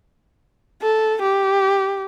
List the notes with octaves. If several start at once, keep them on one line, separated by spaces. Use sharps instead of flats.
A4
G4